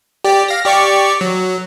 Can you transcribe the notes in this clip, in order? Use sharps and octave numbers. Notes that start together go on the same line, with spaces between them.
G4 D5
F5 A#6
G4 D5 C#6
F#3